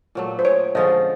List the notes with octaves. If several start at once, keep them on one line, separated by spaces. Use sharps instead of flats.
A#2 F#3 A3
C5
C#5
D3 F3 G#3 C#4 D#5